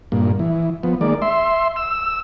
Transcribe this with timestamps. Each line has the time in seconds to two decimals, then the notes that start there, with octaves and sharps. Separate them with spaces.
0.12 G2 A#2
0.39 E3
0.83 F3 B3
1.01 D#3 G#3 A#3 D5
1.22 E5 C6
1.76 E6